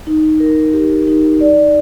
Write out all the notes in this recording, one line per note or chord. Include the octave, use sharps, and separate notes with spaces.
D#4
A#4
G4
D#4
D5